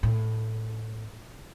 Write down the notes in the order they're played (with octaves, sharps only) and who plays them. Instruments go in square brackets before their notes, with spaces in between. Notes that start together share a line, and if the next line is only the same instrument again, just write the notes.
[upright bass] A2